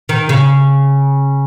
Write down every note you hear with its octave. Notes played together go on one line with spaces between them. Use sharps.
D#3
C#3